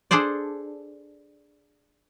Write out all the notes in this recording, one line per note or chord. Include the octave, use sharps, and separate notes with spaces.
D4 G#4 A4 C5 D5